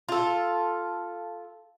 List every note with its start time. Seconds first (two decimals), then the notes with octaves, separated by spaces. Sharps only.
0.09 F4 A4